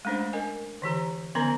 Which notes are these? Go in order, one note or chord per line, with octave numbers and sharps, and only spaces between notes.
G#3 A3 C#4 D4 C5
A#4 D#5 G#5
D3 E3 G4 A#5
D3 F3 B3 C#4 A#4 A#5